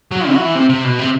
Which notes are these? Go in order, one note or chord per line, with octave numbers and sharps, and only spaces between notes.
F#3
C3
F#3
E3
C3
C3
B2
C3